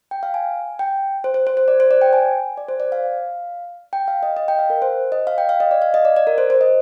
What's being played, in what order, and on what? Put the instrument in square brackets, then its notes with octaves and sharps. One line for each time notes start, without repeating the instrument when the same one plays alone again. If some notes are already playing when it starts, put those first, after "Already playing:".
[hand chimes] G5
F5
G#5
G5
C5
C5
C5
C5
D5
C5
D5
G5
G#5
D5
C5
D5
F5
G5
F5
D#5
D#5
G5
F5
A#4
C5
D#5
F5
G5
F5
D#5
D5
F5
D#5
D5
D5
A#4
C5
C5
D#5